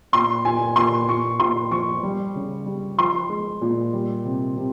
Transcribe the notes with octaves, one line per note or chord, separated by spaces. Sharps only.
A#2 C6
A#2 G#5
A#2 C6
A#2 C#6
A#2 C6
F3 C#6
G3
C#3
G3
F3 C6
G#3
A#2
G3
C3
C3